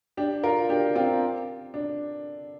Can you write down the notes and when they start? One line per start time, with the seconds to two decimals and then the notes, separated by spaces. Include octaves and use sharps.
0.17 D4 G4
0.43 F4 A#4
0.69 D4 G4
0.95 C4 F4
1.74 D4